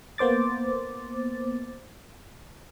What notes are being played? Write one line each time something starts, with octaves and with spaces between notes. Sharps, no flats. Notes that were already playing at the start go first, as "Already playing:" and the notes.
A#3 B3 C5 D6 A6